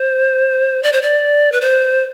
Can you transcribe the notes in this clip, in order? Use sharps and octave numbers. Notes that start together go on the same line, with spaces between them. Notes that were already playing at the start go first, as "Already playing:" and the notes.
Already playing: C5
D5
C5
D5
B4
C5